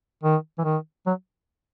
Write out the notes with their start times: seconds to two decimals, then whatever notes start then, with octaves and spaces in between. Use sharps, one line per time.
0.24 D#3
0.58 E3
0.65 D#3
1.07 F#3